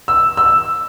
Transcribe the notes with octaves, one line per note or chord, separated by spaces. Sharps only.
E6
E6